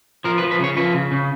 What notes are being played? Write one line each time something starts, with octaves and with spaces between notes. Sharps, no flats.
F3 A#4
B4
F3
B4
C#3 C#5
F3 B4
C#3
C#3